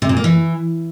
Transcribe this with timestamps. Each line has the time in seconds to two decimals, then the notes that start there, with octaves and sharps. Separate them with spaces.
0.02 C3
0.09 A#2
0.17 A#3
0.24 E3